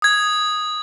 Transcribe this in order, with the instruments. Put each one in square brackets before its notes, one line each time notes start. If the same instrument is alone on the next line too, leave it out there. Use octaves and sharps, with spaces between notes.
[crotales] D#6 G#6